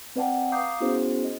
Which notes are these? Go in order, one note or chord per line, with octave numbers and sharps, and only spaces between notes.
C4 B4 D5 F#5 G5 A5
F5 A#5 D6 D#6 G6 C7
B3 C#4 E4 F#4 G#4 C5
D#5